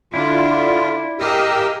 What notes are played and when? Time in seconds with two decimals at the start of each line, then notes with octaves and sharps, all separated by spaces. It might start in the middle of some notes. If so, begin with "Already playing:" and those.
0.14 D3 D4 E4 F4
1.20 G4 G#4 A#4 D#5 F5 E6